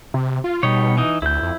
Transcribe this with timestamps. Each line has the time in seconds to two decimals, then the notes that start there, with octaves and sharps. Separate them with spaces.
0.14 C3
0.44 F4
0.63 B2 G3 D#4 C#5
0.97 E3 D#4
1.22 D2 E4 G6
1.43 F2